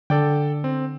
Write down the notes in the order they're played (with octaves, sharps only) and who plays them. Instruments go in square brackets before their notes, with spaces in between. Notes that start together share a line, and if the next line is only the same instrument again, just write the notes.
[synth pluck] D3 [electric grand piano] A4 D5 G5
[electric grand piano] C4